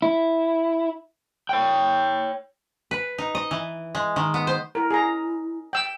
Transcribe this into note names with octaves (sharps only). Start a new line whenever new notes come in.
E4
C#5 G5
B4
D#4
D#5
E3
G#3
D#3
B3
C5
E4 A#4
G#4 A#5
G5 E6